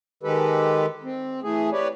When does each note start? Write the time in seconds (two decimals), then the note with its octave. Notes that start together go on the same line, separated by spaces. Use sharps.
0.23 D#3 G#3 G4 A4 B4
1.04 C4
1.43 E3 A3 G#4
1.72 G4 B4 C#5 D5